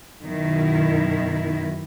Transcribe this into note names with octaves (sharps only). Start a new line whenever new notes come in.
F#2 B2 D#3 E4